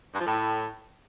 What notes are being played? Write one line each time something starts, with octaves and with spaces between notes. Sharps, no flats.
G2
F3
A2